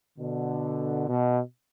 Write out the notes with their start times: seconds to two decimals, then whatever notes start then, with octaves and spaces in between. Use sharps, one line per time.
0.17 B2 D3
1.08 B2